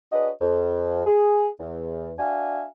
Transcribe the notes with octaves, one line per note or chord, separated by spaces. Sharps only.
D4 F#4 G#4 B4 C#5 D#5
F2
G#4
E2
D4 F#4 E5 F5 G#5